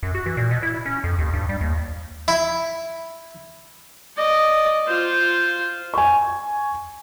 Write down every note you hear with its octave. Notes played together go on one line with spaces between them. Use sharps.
F#2
F#4
E3
A#2
B2
E4
C#4
F2
D#2
G2
G3
D#2
E4
D5 D#5
F4 C5
G#5 C#6